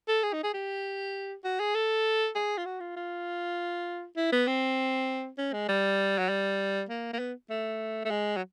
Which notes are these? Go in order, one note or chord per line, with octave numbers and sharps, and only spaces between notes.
A4
G#4
D#4
G#4
G4
F#4
G#4
A4
G#4
F4
F#4
F4
F4
E4
B3
C4
C#4
G#3
G3
F#3
G3
A#3
A#3
B3
A3
A3
G#3
F#3